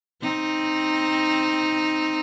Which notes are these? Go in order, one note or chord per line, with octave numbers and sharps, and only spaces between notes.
C4 D#4